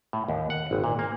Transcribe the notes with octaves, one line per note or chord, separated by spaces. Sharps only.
A2
D#2
F#5
G#1
A#2
A#3